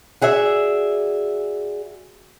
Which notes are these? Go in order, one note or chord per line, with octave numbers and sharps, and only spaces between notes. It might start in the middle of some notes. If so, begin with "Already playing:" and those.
F#4 G#4 D5 E5